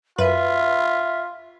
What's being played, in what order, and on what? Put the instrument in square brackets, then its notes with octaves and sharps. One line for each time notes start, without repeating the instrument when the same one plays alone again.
[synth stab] F#2 B4 [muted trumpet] F4 [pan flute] E5